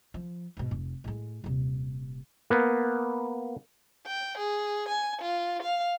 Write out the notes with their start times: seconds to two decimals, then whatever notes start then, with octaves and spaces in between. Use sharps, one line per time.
0.14 F3
0.57 G#2 B2
0.71 F1
1.04 A2 G#3
1.44 D#1 C3
2.50 A#3 B3
4.07 G5
4.38 G#4
4.89 G#5
5.22 F4
5.63 F5